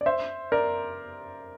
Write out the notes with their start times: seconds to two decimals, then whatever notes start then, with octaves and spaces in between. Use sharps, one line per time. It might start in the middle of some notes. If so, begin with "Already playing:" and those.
0.01 D5
0.06 C5 E5
0.52 A#4 D5